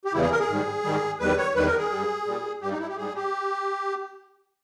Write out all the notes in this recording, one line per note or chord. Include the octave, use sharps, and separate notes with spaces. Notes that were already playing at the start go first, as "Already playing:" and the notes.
G4
E2 C#3 E3 G3 E4
G#4
A#4
G#4
G#2 D#3 G3
G#2 D#3 G3
E2 D#3 G3 B4
C#5
E2 D#3 G3 B4
A#4
G#4
G2 G3
A#2 G3
G2 G3 G4
D#4
E4
G4
G#2 G3 G#4
G4